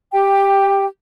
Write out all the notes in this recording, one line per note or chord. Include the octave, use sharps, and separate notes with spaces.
G4 G5